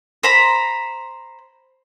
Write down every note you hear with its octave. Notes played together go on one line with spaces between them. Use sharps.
C5 A#5 B5